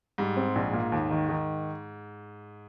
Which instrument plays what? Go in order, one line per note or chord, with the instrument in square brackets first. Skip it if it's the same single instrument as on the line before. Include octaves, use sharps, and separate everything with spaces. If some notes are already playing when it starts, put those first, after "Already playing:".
[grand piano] G#2 [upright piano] G3
[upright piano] C4
A#1
A#2
D#2
D#3
D#3